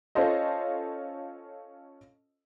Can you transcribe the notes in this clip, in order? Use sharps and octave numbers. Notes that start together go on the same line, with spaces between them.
C#4 F4 A4 C5 D#5